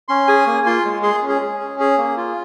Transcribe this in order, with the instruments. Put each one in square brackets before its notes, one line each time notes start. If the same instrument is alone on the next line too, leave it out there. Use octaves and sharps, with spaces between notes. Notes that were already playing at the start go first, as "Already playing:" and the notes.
[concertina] C#4 C6
G#4 G#5
A#3
F4 C6
G#3
G#4 C6
C#4
G#4
C#4
C#4
G#4
A#3
F4